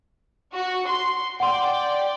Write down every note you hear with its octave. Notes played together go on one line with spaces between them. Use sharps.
F#4
C6
D5 F#5 G5 C6